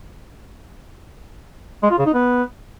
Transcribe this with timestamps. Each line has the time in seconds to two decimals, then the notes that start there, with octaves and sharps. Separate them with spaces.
1.83 G#3
1.90 F4
1.98 C#3
2.06 D#4
2.14 B3